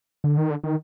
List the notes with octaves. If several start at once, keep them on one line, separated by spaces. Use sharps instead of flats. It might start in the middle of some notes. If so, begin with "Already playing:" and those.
D3
D#3
D3
D#3